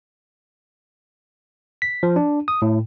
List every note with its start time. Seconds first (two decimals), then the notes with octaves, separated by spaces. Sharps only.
1.82 B6
2.03 F3
2.16 D4
2.48 D#6
2.62 A2